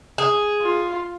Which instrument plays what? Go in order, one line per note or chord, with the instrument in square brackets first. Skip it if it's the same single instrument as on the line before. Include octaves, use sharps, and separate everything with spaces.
[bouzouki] G#4
[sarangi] F4